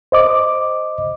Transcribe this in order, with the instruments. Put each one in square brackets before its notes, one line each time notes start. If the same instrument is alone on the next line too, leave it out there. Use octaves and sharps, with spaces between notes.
[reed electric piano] C5 D#5 D6